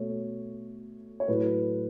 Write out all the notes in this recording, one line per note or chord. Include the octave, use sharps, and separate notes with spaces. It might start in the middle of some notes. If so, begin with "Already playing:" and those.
Already playing: B2 A3 C#5
C#5
A2 F#3 A3 B4